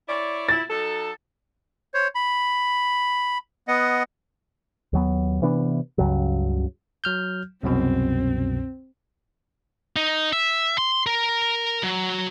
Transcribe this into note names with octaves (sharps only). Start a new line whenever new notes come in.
E4 C#5 D5
E4 A6
F#3 D#4 A4
C5 C#5
B5
B3 D#5 F#5
D#2 F#3 B3
C3 E3 B3 D4
C#2 G2 C#3 F#3
F#3 F6 G6
C2 F#2 B2 C4
D#4
E5
C6
A#4
F#3